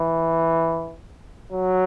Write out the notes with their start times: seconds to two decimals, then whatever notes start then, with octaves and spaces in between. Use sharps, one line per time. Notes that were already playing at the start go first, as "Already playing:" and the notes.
Already playing: E3
1.52 F#3